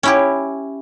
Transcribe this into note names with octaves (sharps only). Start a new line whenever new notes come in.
C#4 E4 G4